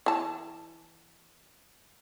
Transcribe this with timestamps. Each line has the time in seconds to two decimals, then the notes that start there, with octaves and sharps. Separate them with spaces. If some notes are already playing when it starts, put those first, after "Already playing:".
0.06 E3 A5